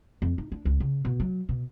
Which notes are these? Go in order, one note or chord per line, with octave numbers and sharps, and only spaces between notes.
F2
D#4
D4
C#2
C#3
B2
F#3
B2